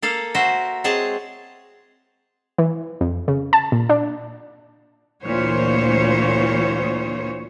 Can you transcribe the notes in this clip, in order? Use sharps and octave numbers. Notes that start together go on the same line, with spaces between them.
A#3 A4 F5
F#4 A#4 C5 E5
G#3 C4 G#4 C#5 A5
E3
F2
C#3
A5
A#2
D4
D2 A#2 E3 C5 C#5